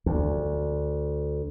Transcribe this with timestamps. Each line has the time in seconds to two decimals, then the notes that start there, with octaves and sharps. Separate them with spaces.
0.06 D2